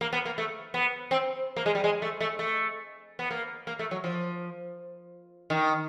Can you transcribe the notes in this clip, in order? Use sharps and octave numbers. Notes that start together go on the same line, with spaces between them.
A#3
B3
A#3
A3
B3
C4
A#3
G#3
G3
G#3
A3
A3
A3
B3
A#3
A#3
A3
F#3
F3
D#3